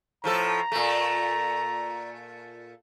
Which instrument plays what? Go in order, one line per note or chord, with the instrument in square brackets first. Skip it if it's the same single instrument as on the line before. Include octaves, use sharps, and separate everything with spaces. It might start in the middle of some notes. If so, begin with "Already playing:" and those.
[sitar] A2 F3 A4 [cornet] A#5
[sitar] A#2 A3